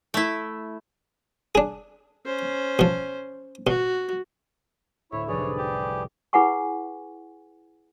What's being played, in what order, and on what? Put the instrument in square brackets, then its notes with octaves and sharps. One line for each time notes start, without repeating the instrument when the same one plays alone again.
[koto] A3 E4
[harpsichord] D4 G#4
[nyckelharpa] C#4 C5
[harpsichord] B2 F3
[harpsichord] B2 [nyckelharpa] F#4
[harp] D2 A2 [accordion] E4 E5 [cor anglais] C#5
[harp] F1 C2 [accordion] G#4 B4 D5 [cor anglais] C#5
[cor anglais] G4
[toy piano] E4 G#4 B4 F#5 G#5 C#6